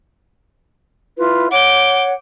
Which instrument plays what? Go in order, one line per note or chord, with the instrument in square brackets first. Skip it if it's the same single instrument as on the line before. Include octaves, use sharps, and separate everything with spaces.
[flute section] E4 F4 B4
[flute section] C#5 F#5 [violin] D6 G6